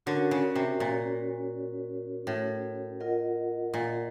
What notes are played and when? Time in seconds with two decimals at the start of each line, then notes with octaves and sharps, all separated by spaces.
0.06 D3 C#4 F#4 A#4 C#5
0.31 C#3
0.55 C3
0.80 A#2
2.27 A2
3.00 F4 A#4 D#5 F#5
3.74 A#2